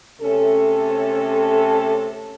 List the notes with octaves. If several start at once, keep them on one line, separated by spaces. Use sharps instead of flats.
C3 A3 C#4 A4